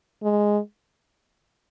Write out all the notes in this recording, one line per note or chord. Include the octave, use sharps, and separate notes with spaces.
G#3